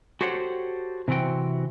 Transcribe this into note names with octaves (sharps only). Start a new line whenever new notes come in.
F#4 G4 A4 C5 C#5 F#5
C3 E3 C4 F#4 G5